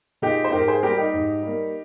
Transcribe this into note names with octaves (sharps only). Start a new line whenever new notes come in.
A#2 G#3 D#4 G4
C5
G#2 G4 A#4
G#4 C5
G3 A#3 G4 A#4
D#4 G4
G#2
G3 A#3